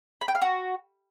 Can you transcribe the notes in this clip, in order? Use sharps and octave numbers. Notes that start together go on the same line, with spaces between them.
B5
G5
F5
F#4